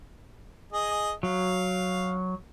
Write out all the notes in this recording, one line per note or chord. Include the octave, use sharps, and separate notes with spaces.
G#4 D#5
F#3 F5